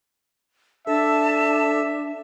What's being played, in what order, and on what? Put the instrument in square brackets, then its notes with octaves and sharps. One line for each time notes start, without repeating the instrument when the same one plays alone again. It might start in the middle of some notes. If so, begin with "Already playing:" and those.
[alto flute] D4 [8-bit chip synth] A4 [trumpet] E5 [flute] A5